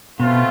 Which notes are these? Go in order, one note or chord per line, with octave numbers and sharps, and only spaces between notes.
B2 A3 C4 F4